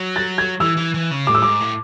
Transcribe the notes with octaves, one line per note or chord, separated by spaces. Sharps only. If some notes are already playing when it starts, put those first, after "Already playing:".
Already playing: F#3
A6
G#6
E3 E6
E3
E3
C#3
A2 D6
E6
G#2 D6
A2